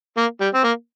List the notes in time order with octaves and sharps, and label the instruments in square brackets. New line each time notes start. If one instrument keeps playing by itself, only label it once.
[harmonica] A#3
G3
C4
A#3